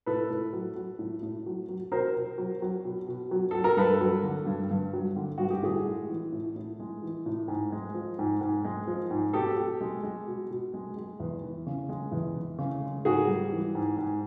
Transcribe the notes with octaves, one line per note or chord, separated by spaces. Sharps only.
A2 A4 B4
A2
F#3
F#3
A2
A2
F#3
F#3
B2 A#4 C5
B2
F#3
F#3
B2
B2
F#3
F#3 A4
A#4
G2 A4 B4
F#3
D3
G2
G2
F#3
D3
G2 F#4
G4
A2 F#4 G#4
G#3
E3
A2
A2
G#3
E3
A2
G#2
G#3
F3
G#2
G#2
G#3
F3
G#2
B2 G4 A4
B2
G#3
G#3
B2
B2
G#3
G#3
E2
E3
C#3
G#3
E2
E3
C#3
G#3
G#2 F#4 G#4
G3
E3
G#2
G#2